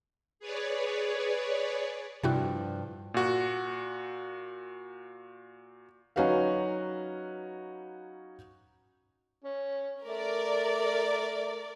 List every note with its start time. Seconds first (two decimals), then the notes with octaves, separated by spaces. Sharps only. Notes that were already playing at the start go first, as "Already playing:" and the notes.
0.39 G#4 B4 C#5 D5
2.23 G2 C3 F3 D4 E4 F#4
3.14 A#2 F#4
6.16 F#3 C#4 D#4 F#4 B4 F5
9.44 C#4
10.05 A3 A#4 D5